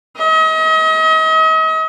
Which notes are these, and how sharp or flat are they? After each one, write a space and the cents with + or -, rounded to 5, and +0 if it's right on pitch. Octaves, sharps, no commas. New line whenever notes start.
D#5 +40